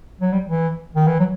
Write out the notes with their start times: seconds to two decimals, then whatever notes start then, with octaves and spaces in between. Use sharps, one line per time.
0.21 F#3
0.33 G3
0.46 E3
0.95 D#3
1.07 E3
1.19 F#3